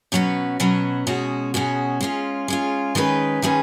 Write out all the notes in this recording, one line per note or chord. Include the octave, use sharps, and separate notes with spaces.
B2 F#3 C#4 F#4 B4
B2 F#3 C#4 F#4 B4
B2 G#3 C#4 F#4
B2 G#3 C#4 F#4
G#3 C#4 F4
G#3 C#4 F4
D#3 G#3 C#4 G#4 B4
D#3 G#3 C#4 G#4 B4